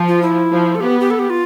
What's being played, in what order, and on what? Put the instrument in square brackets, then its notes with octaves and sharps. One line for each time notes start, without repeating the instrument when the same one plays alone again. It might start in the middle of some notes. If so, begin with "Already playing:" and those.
Already playing: [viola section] F3
[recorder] F4
E4
[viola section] F3
[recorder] A4
[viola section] B3 [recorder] G4
[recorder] G4
A4
G4
F4